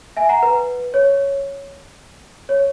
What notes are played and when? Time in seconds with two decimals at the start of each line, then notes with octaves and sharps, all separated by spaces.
0.17 E5 G#5
0.29 F#5 A#5
0.43 B4
0.94 C#5
2.49 C#5